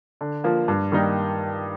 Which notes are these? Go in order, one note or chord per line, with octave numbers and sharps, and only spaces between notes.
D3
F3 A#3
G2
D#3 G3 A#3 D#4